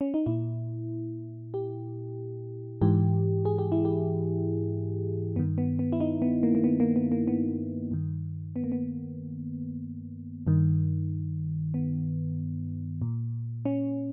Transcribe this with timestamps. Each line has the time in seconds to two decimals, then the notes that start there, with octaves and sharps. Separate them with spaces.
0.01 C#4
0.14 D#4
0.26 A#2 E4
1.54 G4
2.82 G#2 E3 G4
3.45 G#4
3.58 G4
3.72 E4
3.85 G4
5.36 G2 D#3 B3
5.58 B3
5.79 B3
5.92 E4
6.00 D#4
6.22 B3
6.43 A#3
6.55 A#3
6.64 B3
6.80 A#3
6.96 B3
7.12 A#3
7.28 B3
7.91 G2 D#3
8.56 B3
8.64 A#3
8.72 B3
10.47 G2 D#3
11.74 B3
13.02 A#2
13.65 C#4